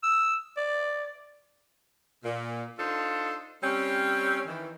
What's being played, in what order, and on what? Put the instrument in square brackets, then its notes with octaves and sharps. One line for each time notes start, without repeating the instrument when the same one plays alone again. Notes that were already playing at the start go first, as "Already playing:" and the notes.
[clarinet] E6
D5
[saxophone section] A#2
D4 D#4 F4 A4 C5
G3 C4 C#4
D#3 E3